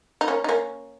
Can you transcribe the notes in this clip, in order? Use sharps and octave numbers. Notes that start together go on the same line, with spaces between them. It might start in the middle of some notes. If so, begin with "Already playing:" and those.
D#4
A#3 C#4
D#4
A#3 C#4